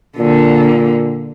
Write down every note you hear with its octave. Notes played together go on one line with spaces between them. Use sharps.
A#2 D3 A#3